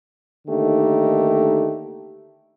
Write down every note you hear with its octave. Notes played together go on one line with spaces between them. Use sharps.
D3 D#3 A3 A#3 D#4 G4